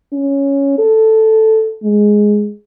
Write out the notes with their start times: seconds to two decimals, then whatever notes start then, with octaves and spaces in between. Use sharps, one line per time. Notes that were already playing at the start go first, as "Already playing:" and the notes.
0.13 C#4
0.78 A4
1.83 G#3